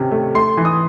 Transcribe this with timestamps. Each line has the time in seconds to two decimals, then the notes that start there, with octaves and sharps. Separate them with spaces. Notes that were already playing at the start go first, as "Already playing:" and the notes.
Already playing: C3 D#3 C#4
0.11 A3
0.35 A3 C6
0.57 E3
0.65 D#6